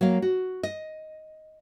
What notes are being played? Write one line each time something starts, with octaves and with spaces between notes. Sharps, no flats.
F#3 A#3 F5
F#4
D#5